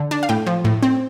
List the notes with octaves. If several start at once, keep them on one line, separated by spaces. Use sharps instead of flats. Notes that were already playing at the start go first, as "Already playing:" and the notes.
Already playing: D3
D4
F5
A2 G5
F3
A2
C4